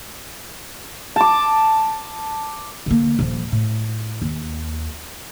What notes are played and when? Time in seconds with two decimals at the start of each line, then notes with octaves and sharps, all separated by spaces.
1.16 A5 D6
2.86 D3 A#3
3.19 D#1 F3
3.52 A2
4.22 D#2